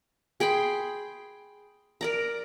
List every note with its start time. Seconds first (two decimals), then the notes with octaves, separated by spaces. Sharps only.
0.40 G#4 G5 B5 C6
2.01 A#4 D5 A#5